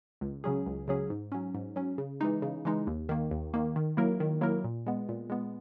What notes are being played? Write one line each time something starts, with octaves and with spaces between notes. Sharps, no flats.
C#2
C#3 F#3 C#4 G#4
C#2
C#3 F#3 C#4 G#4
G#2
F#3 C#4
G#2
F#3 C#4
C#3
E3 G#3 D#4
C#3
E3 G#3 D#4
D#2
D#3 A#3
D#2
D#3 A#3
D#3
F#3 A#3 E4 A#4
D#3
F#3 A#3 E4 A#4
A#2
G#3 B3
A#2
G#3 B3